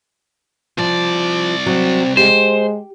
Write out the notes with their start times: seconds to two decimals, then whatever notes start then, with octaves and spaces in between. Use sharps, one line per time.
0.78 C2 F3 D5
1.66 F#3 C4
2.17 G#3 G4 C5